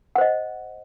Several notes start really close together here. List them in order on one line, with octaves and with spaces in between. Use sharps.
F#5 C5 D#5